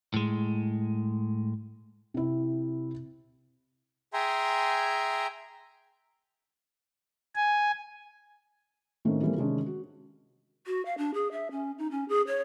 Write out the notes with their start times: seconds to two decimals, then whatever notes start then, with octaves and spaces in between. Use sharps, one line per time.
0.14 A2 G#3
2.14 C3 E4
4.13 G#4 E5 G5 G#5 A#5 C6
7.36 G#5
9.05 A2 D#3 A3 A#3 C4 C#4
9.23 E3 G3 A3 A#3 C4
9.38 C3 D#3 G#3 C#4 D4 G#4
9.66 F#4
10.65 F#4
10.85 F5
10.98 D4
11.14 G#4
11.32 E5
11.51 C#4
11.78 D#4
11.91 C#4
12.09 G#4
12.27 C#5